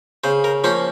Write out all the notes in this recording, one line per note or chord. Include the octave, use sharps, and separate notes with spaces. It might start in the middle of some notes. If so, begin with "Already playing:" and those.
C#3 C5
A#4
F3 A#3 C#4 C5